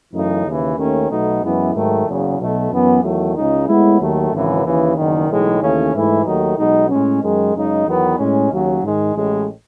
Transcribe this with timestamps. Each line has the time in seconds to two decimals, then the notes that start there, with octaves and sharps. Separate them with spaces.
0.13 F#2 C#3 E3 A3 D#4
0.45 D#2 C#3 E3
0.77 D#2 D#3 A3 C#4
1.09 B1 B2 A3 D#4
1.42 F#2 E3 G#3 B3 E4
1.74 G#2 D#3 F#3 A3
2.06 F#1 E2 C#3 F#3
2.38 B1 B2 A3
2.71 F#2 E3 B3
3.03 E2 D#3 F#3 A3
3.35 C#2 C#3 G#3 D#4
3.67 A2 G#3 B3 E4
4.00 D#2 D#3 F#3 A3
4.32 G#1 F#2 C#3 E3
4.64 D#2 C#3 E3
4.96 F#1 E2 D#3
5.28 B1 A2 E3 G#3 D#4
5.60 D#2 C#3 E3 A3 C#4
5.93 G#2 E3 A3 E4
6.24 D#2 D#3 F#3 A3 D#4
6.57 B1 B2 G#3 D#4
6.89 A2 G#3 C#4
7.21 F#2 D#3 G#3
7.54 F#2 C#3 G#3 D#4
7.86 E2 D#3 F#3 B3
8.18 A2 G#3 C#4
8.50 D#2 C#3 F#3
8.82 G#2 D#3 G#3
9.15 A1 A2 G#3